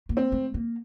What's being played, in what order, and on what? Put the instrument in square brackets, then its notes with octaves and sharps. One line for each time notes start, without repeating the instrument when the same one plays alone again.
[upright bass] A#3
[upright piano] C4
[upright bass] A3
A#3